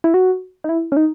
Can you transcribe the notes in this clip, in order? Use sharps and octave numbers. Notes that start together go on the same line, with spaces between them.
E4
F#4
D#4
E4
C#4
D#4